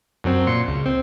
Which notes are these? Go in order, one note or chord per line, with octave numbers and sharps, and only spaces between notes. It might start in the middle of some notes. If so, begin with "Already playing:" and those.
F#2 F#3 C4
A#2 C6 C#7
C#2
C4